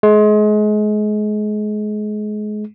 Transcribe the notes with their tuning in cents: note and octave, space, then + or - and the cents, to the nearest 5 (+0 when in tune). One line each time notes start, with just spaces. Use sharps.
G#3 +30